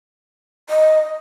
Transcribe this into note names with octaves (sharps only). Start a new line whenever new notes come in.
D#5